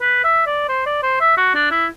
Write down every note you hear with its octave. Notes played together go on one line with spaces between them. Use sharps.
B4
E5
D5
C5
D5
C5
E5
F#4
D4
E4